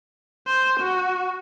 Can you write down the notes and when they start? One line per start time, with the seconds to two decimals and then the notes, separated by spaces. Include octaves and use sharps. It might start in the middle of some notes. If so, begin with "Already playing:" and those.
0.46 C5
0.80 F#4